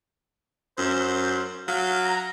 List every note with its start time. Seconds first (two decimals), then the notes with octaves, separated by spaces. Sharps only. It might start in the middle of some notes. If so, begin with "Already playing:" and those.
0.78 F#2 C5
1.68 F#3 F5
2.05 A#5